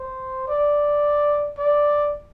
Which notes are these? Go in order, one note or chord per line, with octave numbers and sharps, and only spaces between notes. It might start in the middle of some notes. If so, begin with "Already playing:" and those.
Already playing: C5
D5
D5